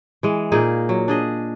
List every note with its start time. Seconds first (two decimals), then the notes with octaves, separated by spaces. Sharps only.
0.23 E3 G#3
0.52 A#2 A#3 D#4 G#4
0.89 F#3
1.08 D4 G#4 D#5